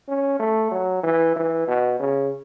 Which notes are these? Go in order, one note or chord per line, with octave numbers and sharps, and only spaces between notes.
C#4
A3
F#3
E3
E3
B2
C#3